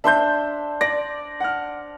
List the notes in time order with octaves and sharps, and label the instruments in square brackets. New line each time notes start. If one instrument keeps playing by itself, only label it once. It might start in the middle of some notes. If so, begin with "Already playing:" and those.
[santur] D4 C5 C6 [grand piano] E5 G6
[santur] D5 [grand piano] A#6
[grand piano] F#5 F6